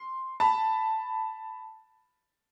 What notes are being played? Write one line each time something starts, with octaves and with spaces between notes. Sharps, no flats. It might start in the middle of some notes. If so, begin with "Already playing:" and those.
Already playing: C6
A5 B5